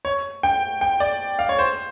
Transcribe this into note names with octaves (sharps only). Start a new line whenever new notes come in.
C#5
G5
G5
D5
F5
C#5
C5